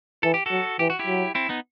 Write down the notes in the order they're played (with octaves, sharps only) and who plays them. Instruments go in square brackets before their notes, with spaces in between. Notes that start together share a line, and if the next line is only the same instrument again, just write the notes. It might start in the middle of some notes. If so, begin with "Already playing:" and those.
[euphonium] E3 [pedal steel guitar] A4
[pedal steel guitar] G4
F#4 A4
[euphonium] F#3
[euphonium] E3 [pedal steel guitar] G4
[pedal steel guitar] F#4
E4 G4
[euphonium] F#3
[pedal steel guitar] C4 E4
B3 D#4